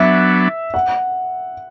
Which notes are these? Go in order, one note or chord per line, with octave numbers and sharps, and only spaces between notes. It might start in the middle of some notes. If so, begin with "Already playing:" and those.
Already playing: F#3 B3 D4 E5
F#5